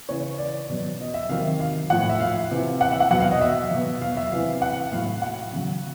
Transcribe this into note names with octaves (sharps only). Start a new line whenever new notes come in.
C#3 E3 C#5
D5
B2 F#3
D#5
E5
C3 D#3 F#3 F5
F5
A2 F3 F#5
E5
F5
C3 E3
F#5
E5
F#5
B2 F#3 F#5
F5
D#5
E5
B2 F#3
F5
E5
C3 E3 F5
F#5
A2 F#3 F5
F#5
C#3 F#3